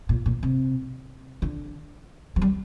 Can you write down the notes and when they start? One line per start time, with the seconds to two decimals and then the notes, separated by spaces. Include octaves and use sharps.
0.09 A#2
0.26 A#2
0.43 C3
1.42 D3
2.36 F3
2.42 G3